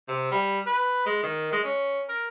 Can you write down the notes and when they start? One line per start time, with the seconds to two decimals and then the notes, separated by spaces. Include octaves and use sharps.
0.08 C3
0.31 G3
0.66 B4
1.06 G#3
1.24 D#3
1.53 G#3
1.64 C#4
2.09 A#4